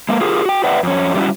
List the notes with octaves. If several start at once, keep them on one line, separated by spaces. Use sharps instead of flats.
G#3 A#3 A#4
F4 G4 G#4 A#4
F#4 G5
B4 D5 E5 F#5 G5
F2 C#4
F#3 G3 A3 C#4 E4 F#4